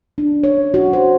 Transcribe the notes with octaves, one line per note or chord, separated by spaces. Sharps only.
D4
C#5
F#4
C5